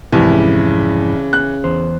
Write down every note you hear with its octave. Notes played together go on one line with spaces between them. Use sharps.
C2 F2 G#2 E3 E4
C#3
F#6
E2 C5